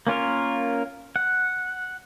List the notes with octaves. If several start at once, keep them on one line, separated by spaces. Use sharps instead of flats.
A#3 C#4 F4 A#4
F#5